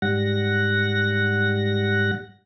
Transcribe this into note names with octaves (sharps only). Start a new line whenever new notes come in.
G#2 G3 F#5 A#6